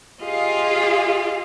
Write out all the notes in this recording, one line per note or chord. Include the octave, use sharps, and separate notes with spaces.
F4 G4 G#4 D#5 F5